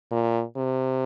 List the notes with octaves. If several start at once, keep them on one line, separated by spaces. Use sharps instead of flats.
A#2
C3